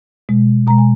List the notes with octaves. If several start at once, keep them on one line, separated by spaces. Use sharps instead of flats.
B2 G#3
B2 G#3 A#5
G#5